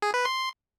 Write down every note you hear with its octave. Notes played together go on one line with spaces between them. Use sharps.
G#4
B4
C6